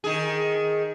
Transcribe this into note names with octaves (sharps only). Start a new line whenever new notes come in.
D#3 G#4